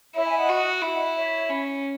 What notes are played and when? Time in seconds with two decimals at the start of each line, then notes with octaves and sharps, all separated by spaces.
0.16 E4 C#5 E5
0.26 E5 G#5
0.37 D#5 F#5
0.49 F#4
0.82 E4
0.94 D#5 F#5
1.16 C#5 E5
1.49 C#4